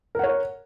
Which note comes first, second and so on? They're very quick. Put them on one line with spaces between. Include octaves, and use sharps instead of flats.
A#4 F#5 C#5